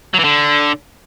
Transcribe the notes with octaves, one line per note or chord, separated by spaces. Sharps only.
F#3
E3
D3